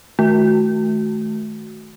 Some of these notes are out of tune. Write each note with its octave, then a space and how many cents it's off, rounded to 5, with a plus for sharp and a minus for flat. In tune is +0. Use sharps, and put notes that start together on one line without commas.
D#3 +0 A3 -35 F#4 +0